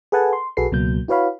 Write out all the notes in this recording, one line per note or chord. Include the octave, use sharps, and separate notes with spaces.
G#4 A4 B4 F#5 G#5 A5
C6
B1 F#4 G#4 A4 B4 C7
C#2 B2 F#3 A#3 G6
E4 F#4 B4 C#5 F5 B5